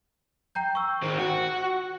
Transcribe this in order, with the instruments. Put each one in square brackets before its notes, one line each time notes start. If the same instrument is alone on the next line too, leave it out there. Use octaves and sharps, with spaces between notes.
[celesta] G5 A#5 G6
C#6 E6
[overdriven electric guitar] D#3 C4
F#4